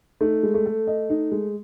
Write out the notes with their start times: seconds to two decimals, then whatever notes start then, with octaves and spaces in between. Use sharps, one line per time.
0.21 A3 D#4
0.43 G#3
0.54 A3
0.66 A4
0.87 D#5
1.10 D#4
1.32 G#3